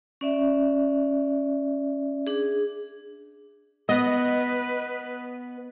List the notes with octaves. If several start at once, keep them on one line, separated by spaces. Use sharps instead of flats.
C#4 D5 E5
D4 G#4
B3 B4 D#5